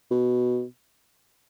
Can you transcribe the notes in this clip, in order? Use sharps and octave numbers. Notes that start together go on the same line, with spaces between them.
B2